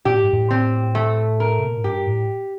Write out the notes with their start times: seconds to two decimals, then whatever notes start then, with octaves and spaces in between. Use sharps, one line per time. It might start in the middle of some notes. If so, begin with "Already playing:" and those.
0.05 A#2 G4
0.14 A2
0.24 G2
0.33 A2
0.51 C4
0.95 A3
1.40 A#4
1.59 C3
1.68 A#2
1.77 A2
1.84 G2 G4
2.07 A2